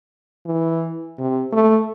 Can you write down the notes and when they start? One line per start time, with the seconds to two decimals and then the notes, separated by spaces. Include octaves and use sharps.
0.46 E3
1.19 C3
1.52 A3